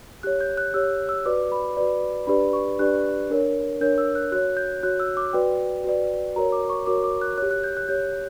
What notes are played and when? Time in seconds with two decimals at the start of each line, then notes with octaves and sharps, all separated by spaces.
0.23 G4 C#5 F#6
0.41 G6
0.57 F#6
0.74 G4 C#5 E6
1.09 E6
1.26 F#4 B4 D5 D6
1.52 B5
1.77 F#4 B4 D5
2.27 D4 G4 B4 D5 B5
2.53 C#6
2.79 D4 G4 B4 D5 F#6
3.30 D4 A#4 C#5
3.81 D4 A#4 C#5 G6
3.98 E6
4.15 F#6
4.32 F#4 F#6
4.35 C#5
4.57 G6
4.83 F#4 C#5 F#6
5.00 E6
5.17 D6
5.33 F#4 B4 D5 G5
5.84 F#4 B4 D5
6.36 F#4 A#4 C#5 A#5
6.52 D6
6.69 C#6
6.86 F#4 A#4 C#5 D6
7.04 D6
7.21 F#6
7.38 G4 C#5 F#6
7.51 F#6
7.64 G6
7.77 F#6
7.88 G4 C#5 G6